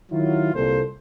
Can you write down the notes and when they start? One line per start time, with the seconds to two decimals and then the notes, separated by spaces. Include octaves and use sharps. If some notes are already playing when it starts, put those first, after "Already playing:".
0.11 D#3 F#3 E4 F4
0.54 C2 A#2 A4 C5